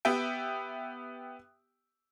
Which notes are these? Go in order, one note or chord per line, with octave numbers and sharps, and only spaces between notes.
B3 G4 E5 G5